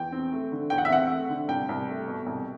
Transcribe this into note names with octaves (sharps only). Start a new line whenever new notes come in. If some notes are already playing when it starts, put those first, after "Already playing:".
Already playing: E2 G5
C4
A3
D3
E2 G5
F#5
E5
C4 F#5
A3
D3
C2 G5
C2
A3
B2
C2